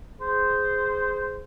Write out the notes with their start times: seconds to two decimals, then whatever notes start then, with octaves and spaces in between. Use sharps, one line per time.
0.20 G#4 C5